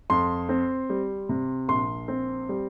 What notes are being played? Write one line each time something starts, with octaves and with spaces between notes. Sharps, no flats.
F2 C6
C4
G3
C3
A#1 C6
C4
G3